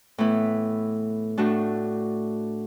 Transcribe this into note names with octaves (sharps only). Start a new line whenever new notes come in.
A2 E3 B3 E4
A2 A3 D4 F#4